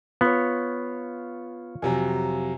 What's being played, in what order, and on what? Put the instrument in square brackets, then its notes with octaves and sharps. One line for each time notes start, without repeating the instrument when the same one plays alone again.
[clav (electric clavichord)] B3 [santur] F4 C#5
[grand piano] F2 C3 F#3 [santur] G#5 A#5